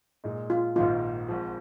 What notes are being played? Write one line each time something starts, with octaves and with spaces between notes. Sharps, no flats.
A#2 G#3 D#4
F4
A#1 G#2 D#3 A#3 D#4 F4
G#1 G#2 F3